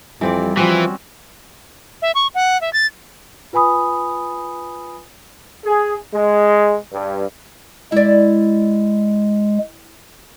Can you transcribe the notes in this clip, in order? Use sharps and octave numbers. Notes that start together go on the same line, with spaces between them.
F2 E3 G3 C4 D5
E3 F3 C4 C#4 F#4
E5
C#6
F#5
E5
A6
F4 B4 G#5 B5 D#6
G#4
G#3
G2
G#3 E4 D5